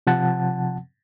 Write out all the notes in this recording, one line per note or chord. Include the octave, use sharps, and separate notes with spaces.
C3 F3 F#5 A5